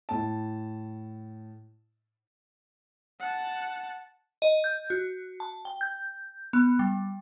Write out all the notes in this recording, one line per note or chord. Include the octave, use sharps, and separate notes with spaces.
A2 A5
F#5 A5
D#5
G6
F#4
A5
G5
G6
B3
G3